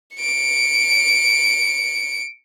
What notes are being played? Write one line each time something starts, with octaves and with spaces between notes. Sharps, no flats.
C#7 D7